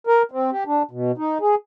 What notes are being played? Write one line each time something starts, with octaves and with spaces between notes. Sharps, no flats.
A#4
C4
G4
D4
B2
D#4
G#4